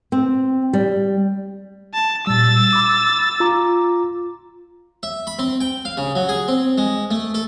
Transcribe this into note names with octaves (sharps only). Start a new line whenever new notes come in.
C4
G3
A5
A#2 G3 E6 A6
B5 D6
F4 A#5 D6
E5
B5
C4
G5
F5
C#3
F#3
G#4
C4
G#3
A3
A4